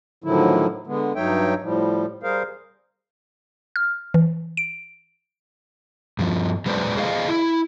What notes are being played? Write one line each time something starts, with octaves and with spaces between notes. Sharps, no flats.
A2 D3 D#3 F3 F#3 E4
D3 G#3 B3
G2 F#3 D#4 C#5 E5 G5
A2 F3 G3
G3 G#4 A#4 C5 F5
F6
E3
D7
G2 F3
F#3 G#3 B4 C5 D5
G#4 C5 D#5 F5
E4